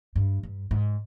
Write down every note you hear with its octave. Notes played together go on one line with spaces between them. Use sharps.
G2
G2
G#2